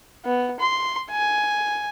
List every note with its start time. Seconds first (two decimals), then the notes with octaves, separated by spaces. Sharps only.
0.25 B3
0.60 C6
1.11 G#5